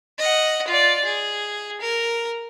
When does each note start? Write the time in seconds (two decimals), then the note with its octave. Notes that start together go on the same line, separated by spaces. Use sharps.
0.18 D#5 F#5
0.67 F4 D5
1.04 G#4
1.81 A#4